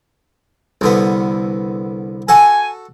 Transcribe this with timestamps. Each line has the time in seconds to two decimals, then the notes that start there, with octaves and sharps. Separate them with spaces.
0.81 C2 D3 B3
2.29 F#4 A4 G#5